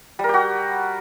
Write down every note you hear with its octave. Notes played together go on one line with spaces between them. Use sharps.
G3 F#4 G4 A#4